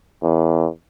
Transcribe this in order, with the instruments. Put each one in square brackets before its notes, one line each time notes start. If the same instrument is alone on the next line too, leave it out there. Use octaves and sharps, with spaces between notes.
[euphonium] E2